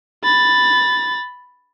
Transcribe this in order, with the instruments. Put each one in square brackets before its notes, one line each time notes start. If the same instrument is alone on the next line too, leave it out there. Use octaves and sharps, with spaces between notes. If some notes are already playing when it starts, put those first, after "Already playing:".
[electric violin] B5 A6